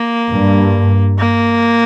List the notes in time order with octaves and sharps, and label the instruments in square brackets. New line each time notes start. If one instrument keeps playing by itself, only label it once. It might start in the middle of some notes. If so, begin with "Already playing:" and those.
Already playing: [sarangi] A#3
[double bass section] G2
[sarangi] A#3